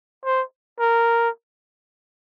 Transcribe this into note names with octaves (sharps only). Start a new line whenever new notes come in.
C5
A#4